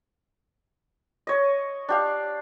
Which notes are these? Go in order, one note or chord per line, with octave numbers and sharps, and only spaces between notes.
C#5 D#5
D4 G4 F5